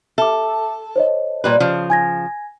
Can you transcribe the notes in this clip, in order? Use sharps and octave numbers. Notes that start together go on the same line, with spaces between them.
A4 E5 D6
C5 C#5 D#5
A#2 G3 B4
C#3 F3
G#5 G#6 A#6